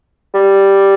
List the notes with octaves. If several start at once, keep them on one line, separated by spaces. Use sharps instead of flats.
G3